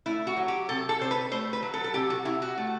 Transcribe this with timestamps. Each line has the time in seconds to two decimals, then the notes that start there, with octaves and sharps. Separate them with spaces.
0.06 A3 E4
0.27 F#4
0.37 F#3
0.48 G4
0.69 C3 A4
0.89 A4
1.00 C3 C5
1.11 B4
1.31 A3 C5
1.53 B4
1.63 F#3
1.74 A4
1.84 A4
1.94 C3 G4
2.10 F#4
2.25 C3 E4
2.42 F#4
2.58 A3